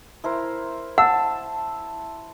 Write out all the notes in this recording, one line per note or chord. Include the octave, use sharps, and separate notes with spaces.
E4 A#4 C5
F#5 A5 E6